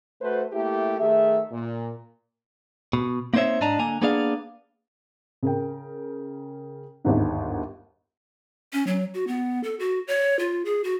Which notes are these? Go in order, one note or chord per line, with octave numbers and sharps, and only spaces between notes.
A3 F#4 B4 C5
A3 A#3 E4 G4
D#3 A3 G#4 E5
A#2
B2
A#3 C4 D#4 C5 C#5 E5
G#2 D4 D#5 A5 A#5
D3 A#3 G#5 A#5
A#3 B3 D4 G#4 D5 F5
C#3 A#4 G5
G1 D#2 G#2
C#4
F#3
F#4
B3
A4
F#4
C#5
F4
G#4
F#4